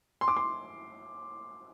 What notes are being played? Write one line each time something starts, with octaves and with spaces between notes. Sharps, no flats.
C6
D6
C6